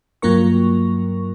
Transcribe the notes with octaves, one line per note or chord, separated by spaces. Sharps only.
G2 F#3 A#3 F4 A#4 C#6